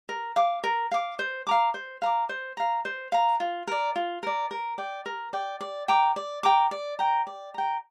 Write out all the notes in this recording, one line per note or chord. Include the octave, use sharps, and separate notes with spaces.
A#4
F5 D6
A#4
F5 D6
C5
F5 A#5 D6
C5
F5 A#5 D6
C5
F5 A#5
C5
F5 A#5
F4
A#4 D5
F4
A#4 D5
A#4
D5 G5
A#4
D5 G5
D5
G5 A#5 D6
D5
G5 A#5 D6
D5
G5 A#5
D5
G5 A#5